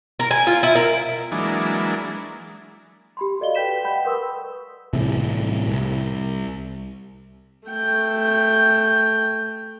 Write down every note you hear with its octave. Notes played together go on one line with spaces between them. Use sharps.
A#4
G#5
F4
E4
A#4
E3 F#3 G#3 A#3 D4
G4 B5 C6
F#4 A4 D5 D#5 F5 G7
A4 B4 G5 G6 B6 E7
F#5 G5 B5 G6
A#4 B4 C6 C#6 D#6 E6
C2 A2 C3 E3
C2
A3 G5